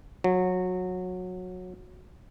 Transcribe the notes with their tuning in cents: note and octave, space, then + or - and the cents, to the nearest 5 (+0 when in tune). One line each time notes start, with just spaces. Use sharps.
F#3 -20